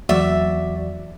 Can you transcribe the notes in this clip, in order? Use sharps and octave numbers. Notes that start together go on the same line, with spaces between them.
E2 F#3 F#4 D5 E5